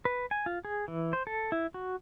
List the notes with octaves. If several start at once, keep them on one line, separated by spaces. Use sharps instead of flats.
B4
G#5
F4
G#4
E3
C5
A4
E4
F#4